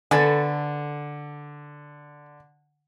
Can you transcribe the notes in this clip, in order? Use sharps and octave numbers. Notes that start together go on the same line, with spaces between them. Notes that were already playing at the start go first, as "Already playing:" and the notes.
D3 A4 B4 G#5